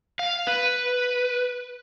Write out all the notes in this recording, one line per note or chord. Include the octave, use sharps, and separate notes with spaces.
F5
B4